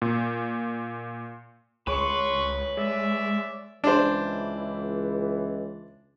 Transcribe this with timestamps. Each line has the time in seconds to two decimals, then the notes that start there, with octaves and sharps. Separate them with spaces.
0.02 A#2
1.87 C#2 G#4 B4 C#5 C6 C#6
2.77 G#3 D5 E5
3.84 C#2 E3 D4 C5